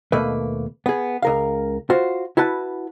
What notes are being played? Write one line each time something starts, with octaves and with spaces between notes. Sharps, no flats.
D#2 B2 A3 A#3 B4
B3 G#4
C#2 A#4 F5
F4 F#4 C5
E4 F#4 B4 A5